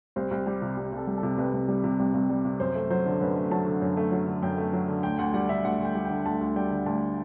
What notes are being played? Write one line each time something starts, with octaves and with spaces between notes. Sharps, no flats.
C2 C5
C2
G3
C3
C2
C2
A4
G3
A4
C3
C2 B4
C2
G3
C3
C2
C2
G3
C3
F#2 C5
A3
F#3 C5
D3
F#2 B4
A3
F#3 A5
D3
F#2
A3
F#3
D3
F#2 G5
A3
F#3
D3
D2 G5
D2 F#5
G3 F#5
D3 E5
D2 F#5
D2 G5
G3
G5
D3
D2 A5
D2
G3 G5
D3
D2 A5